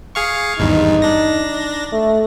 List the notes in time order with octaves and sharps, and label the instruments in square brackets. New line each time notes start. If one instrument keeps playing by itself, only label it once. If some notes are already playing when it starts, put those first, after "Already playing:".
[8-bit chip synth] G#4 F5 C#6
[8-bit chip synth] G#1 E2 G2 [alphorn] D#4
[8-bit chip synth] D4 A#6
[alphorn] A3